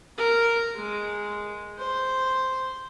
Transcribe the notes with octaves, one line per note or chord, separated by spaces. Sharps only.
A#4
G#3
C5